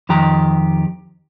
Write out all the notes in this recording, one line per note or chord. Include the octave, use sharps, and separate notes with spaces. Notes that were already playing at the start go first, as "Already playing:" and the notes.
F2 D#3 G4 A#5